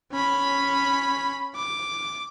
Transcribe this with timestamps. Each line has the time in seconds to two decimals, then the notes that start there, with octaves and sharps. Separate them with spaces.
0.12 C#4 B5
1.55 D6